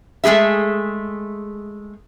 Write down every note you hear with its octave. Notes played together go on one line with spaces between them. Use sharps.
G#3 A3 F#4 G#4 E5